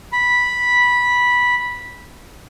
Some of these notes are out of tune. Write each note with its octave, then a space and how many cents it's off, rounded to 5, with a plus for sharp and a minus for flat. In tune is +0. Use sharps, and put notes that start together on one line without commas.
B5 -10